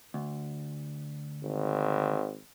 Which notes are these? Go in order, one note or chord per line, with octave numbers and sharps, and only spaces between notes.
D2
G#1